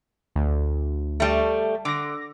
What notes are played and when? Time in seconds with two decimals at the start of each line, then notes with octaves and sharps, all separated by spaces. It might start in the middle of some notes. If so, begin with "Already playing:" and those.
0.36 D2
1.20 G3 A3
1.85 D3 D6 A#6